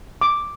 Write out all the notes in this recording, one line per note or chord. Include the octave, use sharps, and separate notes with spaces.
D6